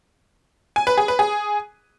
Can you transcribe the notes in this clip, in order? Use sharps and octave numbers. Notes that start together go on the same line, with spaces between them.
G#5
B4
G#4
B4
G#4